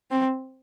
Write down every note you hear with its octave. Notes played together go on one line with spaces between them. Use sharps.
C4